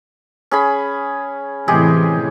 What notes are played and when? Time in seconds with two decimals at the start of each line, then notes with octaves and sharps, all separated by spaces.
0.51 C#4 G#4 B5
1.68 A2 C3 E3 G#3 G4 G#4